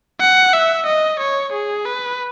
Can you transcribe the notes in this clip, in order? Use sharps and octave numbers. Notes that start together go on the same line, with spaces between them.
F#5
E5
D#5
C#5
G#4
B4